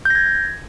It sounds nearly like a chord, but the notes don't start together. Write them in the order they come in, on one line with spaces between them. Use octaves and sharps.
G6 A#6 G#6